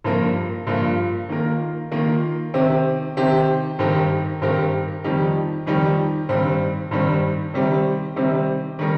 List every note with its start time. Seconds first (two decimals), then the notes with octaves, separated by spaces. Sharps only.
0.04 G2 F3 A#3 F4 A#4
0.67 G2 F3 A#3 F4 A#4
1.29 D#3 A#3 F4 A#4
1.91 D#3 A#3 F4 A#4
2.54 C3 D#3 C4 G4
3.17 C3 D#3 C4 G4
3.79 G2 D#3 C4 G4 A#4
4.41 G2 D#3 C4 G4 A#4
5.04 F2 D#3 G3 D#4 G4
5.66 F2 D#3 G3 D#4 G4
6.29 G2 D#3 G3 C4
6.91 G2 D#3 G3 C4
7.54 C3 D#3 G3 C4 G4
8.16 C3 D#3 G3 C4 G4
8.79 D#3 G3 D#4 A#4